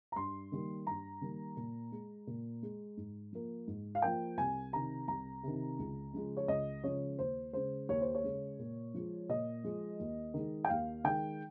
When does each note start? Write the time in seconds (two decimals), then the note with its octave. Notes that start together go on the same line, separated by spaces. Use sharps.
0.12 A#5
0.16 G2 C6
0.52 D#3 G3 A#3
0.87 G2 A#5
1.21 D#3 G3 A#3
1.57 A#2
1.92 G#3
2.27 A#2
2.62 G#3
2.97 G#2
3.33 F3 A#3
3.67 G#2
3.95 F5
4.02 F3 A#3 G5
4.37 C2 G#5
4.73 C3 D#3 A#5
5.08 C2 A#5
5.43 C3 D#3
5.79 C#2
6.13 C#3 F3 G#3
6.37 C#5
6.48 C#2 D#5
6.84 C#3 F3 G#3 C#5
7.18 D#2 C5
7.53 C#3 G#3 C5
7.89 D#2 C#5
8.01 C5
8.15 C#5
8.24 C#3 G#3
8.59 A#2
8.94 F3 G#3
9.29 A#2 D#5
9.64 F3 G#3
10.00 D#2
10.34 D#3 G#3
10.65 G5
10.69 D#2 F5
11.04 D#3 G#3 G5